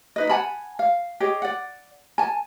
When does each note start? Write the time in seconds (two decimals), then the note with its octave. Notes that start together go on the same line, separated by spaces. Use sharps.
0.16 D#4 B4 D#5
0.29 F#5 G#5 A5 B5
0.79 F5
1.20 G4 G#4 C#5 D#5
1.42 D5 F#5
2.18 G#5 A5